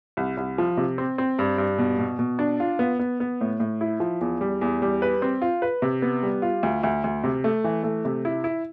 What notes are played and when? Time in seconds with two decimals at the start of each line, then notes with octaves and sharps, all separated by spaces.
0.17 C2
0.37 C2
0.58 F3
0.77 C3
0.98 C4
1.18 C4
1.39 G2
1.58 G2
1.78 B2
1.99 B2
2.19 B2
2.39 D4
2.60 F4
2.79 B3
2.99 B3
3.20 B3
3.41 A2
3.60 A2
3.81 E4
4.00 F3
4.21 E2
4.41 G3
4.61 E2
4.82 G3
5.02 B4
5.22 C4
5.42 F4
5.62 B4
5.82 C3
6.02 B3
6.23 G3
6.42 F4
6.63 D2
6.83 D2
7.04 D2
7.24 C3
7.44 A3
7.64 E3
7.83 A3
8.05 C3
8.25 E4
8.44 E4